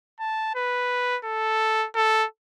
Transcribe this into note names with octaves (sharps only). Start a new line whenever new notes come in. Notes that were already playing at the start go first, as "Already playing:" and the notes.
A5
B4
A4
A4